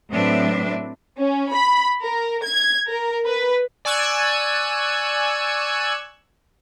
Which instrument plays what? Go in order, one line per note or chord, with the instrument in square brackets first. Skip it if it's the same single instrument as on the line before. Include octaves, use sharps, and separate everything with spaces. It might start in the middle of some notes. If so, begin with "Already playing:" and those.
[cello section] A2 F#3 C4 D4 B4 E5
[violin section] C#4
B5
A#4
G#6
A#4
B4
[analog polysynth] D5 G#5 C#6 E6 F#6 G#6